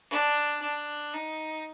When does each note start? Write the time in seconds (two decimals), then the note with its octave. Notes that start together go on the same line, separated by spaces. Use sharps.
0.11 D4
0.62 D4
1.14 D#4